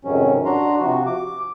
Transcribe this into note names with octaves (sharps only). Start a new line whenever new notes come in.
F2 G#2 C3 D#3 F#3 C#4
D4 F#4 A#5 C6
C3 F3 F#4
D6